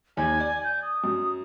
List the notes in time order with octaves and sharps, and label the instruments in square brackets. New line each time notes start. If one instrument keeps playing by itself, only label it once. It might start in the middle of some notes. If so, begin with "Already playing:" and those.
[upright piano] D#2 [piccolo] G#5
[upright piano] D5
[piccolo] G6
D#6
[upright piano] F#2